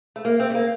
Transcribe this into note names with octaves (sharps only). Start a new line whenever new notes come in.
A3
A#3
C4
A3
A#3